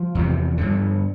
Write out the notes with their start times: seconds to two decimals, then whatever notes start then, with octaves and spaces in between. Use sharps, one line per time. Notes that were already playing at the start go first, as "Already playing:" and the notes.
Already playing: F3
0.15 E2 C3
0.58 G2 D3